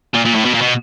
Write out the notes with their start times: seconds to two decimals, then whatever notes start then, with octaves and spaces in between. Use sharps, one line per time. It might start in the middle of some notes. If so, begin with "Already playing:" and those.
0.14 A#2
0.25 A#2
0.35 A2
0.45 B2
0.54 A#2
0.62 B2